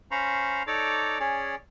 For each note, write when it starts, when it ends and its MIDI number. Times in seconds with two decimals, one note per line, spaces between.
0.11 0.63 61
0.11 0.63 72
0.11 0.63 77
0.11 0.63 82
0.11 0.63 83
0.11 0.63 85
0.67 1.18 63
0.67 1.18 69
0.67 1.18 73
0.67 1.18 74
0.67 1.18 82
0.67 1.18 86
1.20 1.55 61
1.20 1.55 68
1.20 1.55 73
1.20 1.55 74